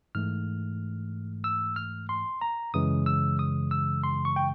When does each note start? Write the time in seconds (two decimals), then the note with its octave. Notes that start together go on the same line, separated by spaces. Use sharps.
0.15 G#2 E3 A3 F6
1.44 E6
1.76 F6
2.09 C6
2.41 A#5
2.74 F#2 C#3 E3 G#3 D#6
3.06 E6
3.39 D#6
3.71 E6
4.04 C6
4.25 C#6
4.36 G5